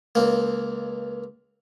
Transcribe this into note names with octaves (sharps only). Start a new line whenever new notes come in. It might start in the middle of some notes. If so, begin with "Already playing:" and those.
C#2 A#3